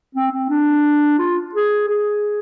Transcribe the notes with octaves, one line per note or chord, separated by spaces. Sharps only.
C4
C4
D4
F4
G#4
G#4